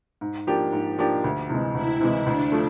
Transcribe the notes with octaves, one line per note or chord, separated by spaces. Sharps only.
G#2
F3 A#3 D4 G4
G#2
F3 A#3 D4 G4
D2
C3 E3 G#3
D2 E4
C3 E3 G#3
D2 D4
F3 A3